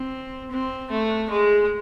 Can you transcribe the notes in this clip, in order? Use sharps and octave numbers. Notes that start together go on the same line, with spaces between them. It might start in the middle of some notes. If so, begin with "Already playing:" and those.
Already playing: C4
C4
A3
G#3